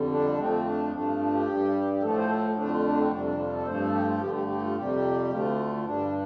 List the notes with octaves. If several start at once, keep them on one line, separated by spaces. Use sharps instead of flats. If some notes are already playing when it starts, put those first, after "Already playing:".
Already playing: F2 D3 G3
D4
F2 F3 A3 C4
D4
G2 F3 A3 D4
F4
D4
G4
G2 G3
G4
A2 F3 A3 A4
C5
A4
F2 D3 A3 D4
F4
D4
C4
F2 C3 G3 D4
D4
F4
A4
G2 F3 A3 C5
A4
G4
F4
G2 D3 A3 G4
G4
G4
F4
F2 C3 G3 G4
D2 D3 A3 F4
F4
G2 G3 D4